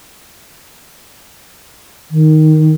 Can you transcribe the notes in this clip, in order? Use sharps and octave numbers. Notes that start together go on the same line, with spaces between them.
D#3